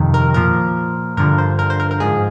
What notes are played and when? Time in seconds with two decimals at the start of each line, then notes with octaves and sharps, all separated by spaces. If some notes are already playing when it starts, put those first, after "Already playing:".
Already playing: F2 C3 D#3
0.14 A#4
0.34 A#2 F3 A#4
1.17 G2 D3 F3 A#4
1.38 C5
1.59 A#4
1.70 C5
1.80 A#4
1.91 A#4
2.00 G#2 F3 G#4